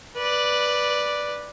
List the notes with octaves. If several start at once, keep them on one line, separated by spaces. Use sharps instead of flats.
B4 D5